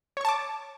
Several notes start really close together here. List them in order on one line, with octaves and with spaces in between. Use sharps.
C#5 C#6 A5 D6